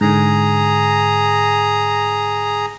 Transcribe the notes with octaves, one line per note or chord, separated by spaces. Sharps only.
G#2 D3 G#4 A#5